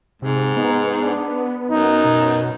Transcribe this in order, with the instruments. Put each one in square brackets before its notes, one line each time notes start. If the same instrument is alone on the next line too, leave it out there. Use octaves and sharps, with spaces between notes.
[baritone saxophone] G#2 [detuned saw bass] C3
[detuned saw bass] B3 [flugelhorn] D#4
[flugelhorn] D4
[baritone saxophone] F#2 [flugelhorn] D#4
[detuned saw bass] B2